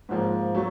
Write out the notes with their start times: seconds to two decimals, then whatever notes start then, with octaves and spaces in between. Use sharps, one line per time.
0.09 G#2 F3 A#3
0.55 F#3 A3